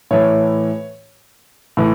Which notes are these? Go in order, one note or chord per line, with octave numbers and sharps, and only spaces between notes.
A2 E3 C#5
A2 E3